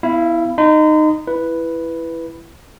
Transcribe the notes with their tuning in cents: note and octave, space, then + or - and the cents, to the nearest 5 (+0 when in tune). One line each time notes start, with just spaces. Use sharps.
B3 +25 E4 +0 F5 -35
D#4 -10 C6 -45
E4 +10 B4 +0